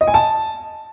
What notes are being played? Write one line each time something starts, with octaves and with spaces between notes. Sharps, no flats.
D#5
G#5
A5